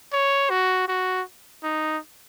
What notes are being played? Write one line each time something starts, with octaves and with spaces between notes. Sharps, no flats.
C#5
F#4
F#4
D#4